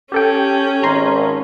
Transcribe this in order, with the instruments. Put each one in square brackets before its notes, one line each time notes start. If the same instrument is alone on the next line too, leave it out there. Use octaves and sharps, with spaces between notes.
[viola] C#4 [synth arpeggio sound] G4 A4 G5
[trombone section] G#1 [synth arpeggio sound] A#5 C6